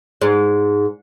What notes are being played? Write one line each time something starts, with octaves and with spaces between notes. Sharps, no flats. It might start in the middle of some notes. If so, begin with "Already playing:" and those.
G#2